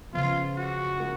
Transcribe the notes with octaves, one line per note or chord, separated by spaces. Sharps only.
C#3 F3 B3 F4
F#4
G#3 C#4 F4 A#4